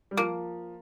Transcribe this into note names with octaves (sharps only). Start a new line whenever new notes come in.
G3
F3 A#3